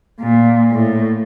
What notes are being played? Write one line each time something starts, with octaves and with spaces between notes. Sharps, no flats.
A#2
A2